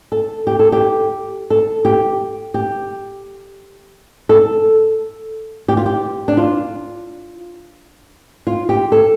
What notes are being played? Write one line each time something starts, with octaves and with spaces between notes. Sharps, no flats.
A4
G4
A4
G4
A4
G4
G4
A4
G4
F4
G4
D4
F4
F4
G4
A4